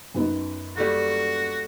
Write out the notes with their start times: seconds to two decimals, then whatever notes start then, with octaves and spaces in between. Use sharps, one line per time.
0.14 F#2 B3 D#4
0.77 G3 A3 A#3 F#4